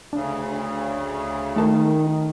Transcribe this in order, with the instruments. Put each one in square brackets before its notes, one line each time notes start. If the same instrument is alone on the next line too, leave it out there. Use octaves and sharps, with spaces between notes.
[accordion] D2 C#3 [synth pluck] D4
[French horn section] D#3 [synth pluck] A3 A4 A#4 [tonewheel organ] D#4